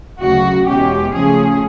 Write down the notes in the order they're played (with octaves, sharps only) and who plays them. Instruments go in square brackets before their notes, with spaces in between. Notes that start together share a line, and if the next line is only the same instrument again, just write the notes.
[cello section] D2 C#3 F#3 F#4
E2 B2 G#3 C#4 G4
C#3 F3 A3 C#4 G#4